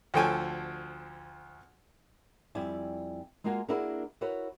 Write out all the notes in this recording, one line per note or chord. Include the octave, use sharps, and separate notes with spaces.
D2 F3 A4 C#5 G5 G#5
F2 G3 E4 D5 G#5
G#3 A#3 F4 F#4 G#5
A#3 D4 E4 F#4 G#4 A#4
E4 F#4 A#4 B4 C#5